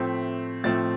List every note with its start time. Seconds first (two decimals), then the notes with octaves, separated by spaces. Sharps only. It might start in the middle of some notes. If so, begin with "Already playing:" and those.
Already playing: A2 F3 A3 C4 B6
0.64 A2 F3 A3 C4 A6